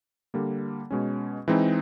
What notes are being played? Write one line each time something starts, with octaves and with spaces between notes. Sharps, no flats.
D3 G3 A#3
B2 G#3 C#4
E3 G#3 C4 D#4